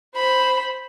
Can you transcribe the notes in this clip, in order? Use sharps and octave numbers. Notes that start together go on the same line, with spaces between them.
C5 B5